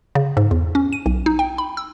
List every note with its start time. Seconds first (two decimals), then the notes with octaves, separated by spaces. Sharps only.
0.15 C#3
0.37 G#2
0.51 E2
0.75 C#4
0.93 D#7
1.06 B1
1.26 D#4
1.39 G5
1.58 B5
1.77 E6